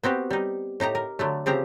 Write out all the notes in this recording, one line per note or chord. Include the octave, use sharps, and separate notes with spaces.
B3 C4 F#4 G4
G3 D#4
A2 D#4 G4 A#5
A#4
D3 F#3 A3
C#3 F3 C4 G4 A#5